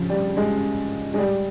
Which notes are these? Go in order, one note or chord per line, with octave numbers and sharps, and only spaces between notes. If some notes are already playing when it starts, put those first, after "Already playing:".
Already playing: C#3 F3
G3
G#3
G#3
G3